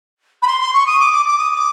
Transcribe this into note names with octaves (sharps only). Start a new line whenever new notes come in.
B5
C6
C6
C#6
D#6
D6
D6
D6
D#6
D6